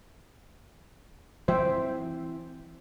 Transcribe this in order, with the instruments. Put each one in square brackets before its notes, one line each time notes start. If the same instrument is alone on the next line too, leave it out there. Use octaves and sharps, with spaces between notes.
[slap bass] E3 C4 [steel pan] C5 E5 G5